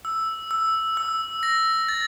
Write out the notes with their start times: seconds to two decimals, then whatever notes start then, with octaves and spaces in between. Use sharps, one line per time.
0.05 E6
0.51 E6
0.97 E6
1.43 A#6
1.89 A6